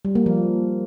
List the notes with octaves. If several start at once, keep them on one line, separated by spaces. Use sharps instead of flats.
G3
A#3
F3